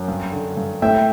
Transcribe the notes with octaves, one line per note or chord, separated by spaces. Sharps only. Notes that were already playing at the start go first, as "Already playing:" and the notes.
Already playing: F#2
G2
D3
G2
A2 E5 G5